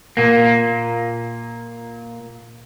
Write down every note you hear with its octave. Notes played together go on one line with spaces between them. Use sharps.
A#2 A#3